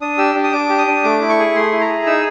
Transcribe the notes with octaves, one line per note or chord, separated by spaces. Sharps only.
D4 D#6
G4 E6
D4
D#6
D4 D6
G4
D#6
D4
A3 D6
E4
C#6
G#4
A3 C6
E4
A#5
G#4
D#4 E6